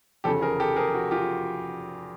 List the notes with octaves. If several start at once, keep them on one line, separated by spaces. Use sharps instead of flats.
F1 E2 C#3 F3 G4 A4
G#4 A#4
G4 A4
G#4 A#4
F#4
F4 G4